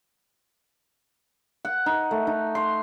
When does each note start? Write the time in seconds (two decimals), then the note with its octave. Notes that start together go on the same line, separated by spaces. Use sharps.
1.65 F#5
1.86 D#4
2.11 A3
2.27 D#4
2.55 C6